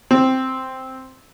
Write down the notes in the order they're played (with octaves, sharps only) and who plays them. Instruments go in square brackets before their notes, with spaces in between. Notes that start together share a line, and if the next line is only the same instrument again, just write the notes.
[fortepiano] C4